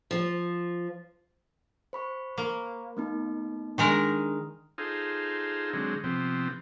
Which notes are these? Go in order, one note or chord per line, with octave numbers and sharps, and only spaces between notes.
F3
C5 B5 C#6
A#3
A3 B3 D#4
D#3 G#3 D4 A#4 D#6
D#4 F4 G#4 A4 C5
D3 F#3 G#3 C4
C3 F3 B3 C4